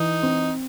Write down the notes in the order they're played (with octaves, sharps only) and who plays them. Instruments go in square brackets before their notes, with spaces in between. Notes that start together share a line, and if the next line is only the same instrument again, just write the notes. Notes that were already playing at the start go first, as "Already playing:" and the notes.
Already playing: [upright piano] E3 [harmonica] D#4
[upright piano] C4